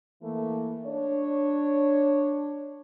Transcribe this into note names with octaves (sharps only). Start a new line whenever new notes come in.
E3 A3 A#3
D4 C#5